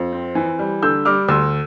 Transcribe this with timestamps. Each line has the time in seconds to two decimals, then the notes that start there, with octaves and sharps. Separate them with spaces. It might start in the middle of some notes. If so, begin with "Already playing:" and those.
Already playing: F2
0.12 C4
0.35 E3
0.59 G3
0.82 D3 E6 G6
1.05 G3 D6 F6
1.28 D2 C6 E6